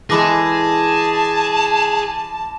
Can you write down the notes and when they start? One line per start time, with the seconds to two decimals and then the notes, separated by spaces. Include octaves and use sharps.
0.10 E3 G#3 G#4 A4 A5 B5 D6 A#6